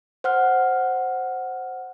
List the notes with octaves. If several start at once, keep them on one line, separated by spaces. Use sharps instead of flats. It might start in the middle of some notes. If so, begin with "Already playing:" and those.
C5 F#5 F6